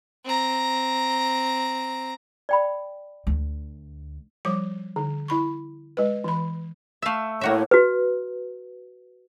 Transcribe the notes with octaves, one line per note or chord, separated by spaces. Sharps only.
C4 A#5
D5 G5 B5
D2
F3 G3 D6
D3
E4 B5 C#6
G#3 B4
E3 B5
A3 E5 F5 E6
A2 A#3 F#4 C#5 E5
F#4 B4